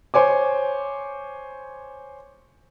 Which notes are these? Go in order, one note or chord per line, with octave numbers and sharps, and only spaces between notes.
C5 C#5 G#5 D6